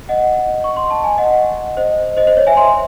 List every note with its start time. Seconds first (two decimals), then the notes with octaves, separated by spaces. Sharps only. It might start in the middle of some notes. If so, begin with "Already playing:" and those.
0.09 D#5 F#5
0.64 C#6
0.76 C6
0.91 A5
1.04 G#5
1.18 D#5 F#5
1.77 C5 D#5
2.17 C5 D#5
2.27 C5
2.37 C#5
2.47 E5 G#5
2.57 G#5 C6